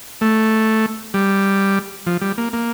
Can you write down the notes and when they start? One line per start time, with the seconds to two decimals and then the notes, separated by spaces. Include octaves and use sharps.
0.21 A3
1.14 G3
2.07 F3
2.21 G3
2.38 A#3
2.53 A#3